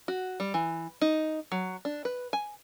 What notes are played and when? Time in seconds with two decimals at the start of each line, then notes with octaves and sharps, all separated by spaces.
0.08 F#4
0.40 G3
0.54 E3
1.01 D#4
1.52 F#3
1.85 D4
2.05 B4
2.33 G#5